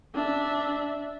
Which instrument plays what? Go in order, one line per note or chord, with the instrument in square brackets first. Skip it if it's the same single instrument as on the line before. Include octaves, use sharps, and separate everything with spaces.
[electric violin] D4 E5